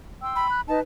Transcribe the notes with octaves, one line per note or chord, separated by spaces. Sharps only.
G5 C6 E6
B5
F#6
D#4 B4 D#5 A5